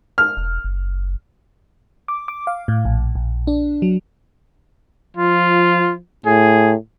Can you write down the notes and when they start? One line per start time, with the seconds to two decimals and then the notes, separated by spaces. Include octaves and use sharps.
0.18 F6
0.37 E1
0.64 F#1
2.08 D6
2.28 D6
2.47 F5
2.68 A2
2.85 A#1
3.15 A#1
3.47 D4
3.82 F#3
5.17 F3 F4
6.26 A2 G#4